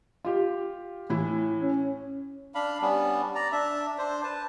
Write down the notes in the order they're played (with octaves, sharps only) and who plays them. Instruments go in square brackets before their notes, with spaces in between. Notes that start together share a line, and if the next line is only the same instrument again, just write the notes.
[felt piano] F4 G4
A2 E3 E4
[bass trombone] C#4
[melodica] D4 F5 B5
G3 B3 C#4 D4
D5 A#5
D4 E5
D4 C5
B4 A5